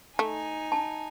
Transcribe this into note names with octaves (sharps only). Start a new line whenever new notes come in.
A3 D#4 G#5
A5